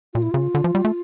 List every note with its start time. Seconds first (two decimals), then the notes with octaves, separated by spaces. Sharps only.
0.14 A#2 F4
0.22 E4
0.31 C#3 F4
0.55 D3
0.64 F3
0.75 G3
0.85 A3